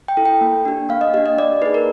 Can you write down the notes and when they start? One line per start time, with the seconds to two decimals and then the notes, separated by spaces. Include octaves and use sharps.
0.08 G5
0.17 E4 A4
0.25 G5
0.41 A#3
0.65 D4 G4
0.89 A#3 F5
1.01 D#5
1.14 G4 D#5
1.17 D4
1.26 D#5
1.38 A#3 D5
1.62 D#4 G#4 B4
1.74 A#4